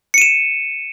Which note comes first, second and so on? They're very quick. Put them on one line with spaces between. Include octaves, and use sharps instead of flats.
C#7 D#7 E7